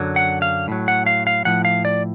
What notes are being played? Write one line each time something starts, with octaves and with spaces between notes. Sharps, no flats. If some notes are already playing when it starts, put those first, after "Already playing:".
Already playing: F#2 D3 F#3
F#5
F5
A2 F#3
F#5
F5
F5
A2 F3 F#5
F5
D5